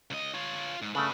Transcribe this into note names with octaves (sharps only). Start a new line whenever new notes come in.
C#2 D#5
F4 C#5
G#2
C#3 A3 D4 B4